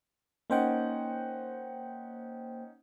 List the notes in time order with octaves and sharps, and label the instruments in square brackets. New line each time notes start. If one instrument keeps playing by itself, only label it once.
[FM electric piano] A#3 C5 G5 [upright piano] C#4 D#4 F#5